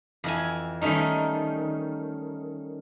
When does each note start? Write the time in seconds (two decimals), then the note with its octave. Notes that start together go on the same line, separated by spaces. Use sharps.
0.24 F2 E3 G#5
0.81 D#3 G3 A3 C#4 D#4